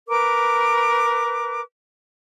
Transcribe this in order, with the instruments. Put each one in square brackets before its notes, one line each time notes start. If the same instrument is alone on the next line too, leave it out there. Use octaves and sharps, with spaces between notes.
[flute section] A#4 B4 D6